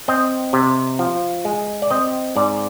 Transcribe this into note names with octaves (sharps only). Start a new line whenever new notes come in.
C4 D#5
C3
F3
G#3
D5
C4 D#5
G#2 D5